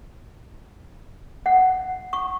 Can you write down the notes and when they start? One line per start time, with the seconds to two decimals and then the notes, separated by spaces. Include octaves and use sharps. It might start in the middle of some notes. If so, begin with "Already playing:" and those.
1.46 F#5
2.13 C#6